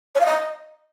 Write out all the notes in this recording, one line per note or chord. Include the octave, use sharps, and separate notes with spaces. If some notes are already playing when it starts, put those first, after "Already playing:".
C#5
F5
D#5